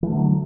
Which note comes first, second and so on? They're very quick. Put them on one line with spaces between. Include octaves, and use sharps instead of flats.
E3 A3 D3 F#3